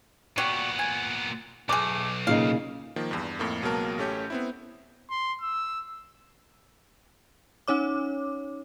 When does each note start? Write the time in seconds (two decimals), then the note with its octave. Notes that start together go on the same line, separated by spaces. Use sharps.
0.38 A#2 F#3 G3 B3 F#4
0.79 G#5
1.69 B1 A3 G#4 D6
2.27 A#2 C#3 D#4 F5
2.96 D#3 F3 A#3
3.11 E2 G2
3.39 F2 A2 A#3
3.62 C#2 B2 F#3 A#3 A#4 A5
3.98 A1 A3 C#4 G4 C#5 G6
4.30 B3 C4 E4
5.10 C6
5.42 E6
7.68 C#4 D#4 C#5 D6